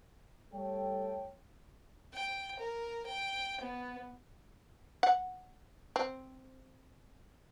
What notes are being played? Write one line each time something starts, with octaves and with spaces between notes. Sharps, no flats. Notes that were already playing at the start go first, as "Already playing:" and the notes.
G3 A3 A4 C#5 G5
G5
A#4
G5
B3
F#5
C4